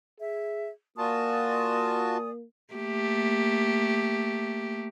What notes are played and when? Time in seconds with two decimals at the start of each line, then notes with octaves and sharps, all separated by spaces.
0.20 G#4 E5
0.98 A#3 F4 F#4 D5 G#5 A5 D#6
2.74 A3 A#3 G4